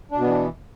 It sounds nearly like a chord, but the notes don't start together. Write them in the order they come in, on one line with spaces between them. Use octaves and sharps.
D4 B2 B3 E3